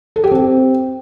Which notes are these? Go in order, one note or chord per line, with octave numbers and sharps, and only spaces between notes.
A4
G4
C4